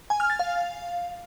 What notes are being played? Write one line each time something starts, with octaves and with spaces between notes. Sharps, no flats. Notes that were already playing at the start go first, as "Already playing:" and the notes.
G#5
F6
A6
F5